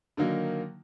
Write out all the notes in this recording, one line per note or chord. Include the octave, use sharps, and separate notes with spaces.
D3 D#3 F#3 A#3 D#4